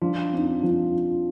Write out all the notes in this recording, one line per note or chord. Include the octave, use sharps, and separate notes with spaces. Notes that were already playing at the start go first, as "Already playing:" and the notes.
F3 D4 F4
C4 D#4
F3